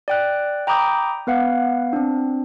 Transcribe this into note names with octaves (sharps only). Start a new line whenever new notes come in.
D5 G5 F#6
G5 A#5 B5 D6 D#6 G6
B3 B4 F5 F#5
C4 D4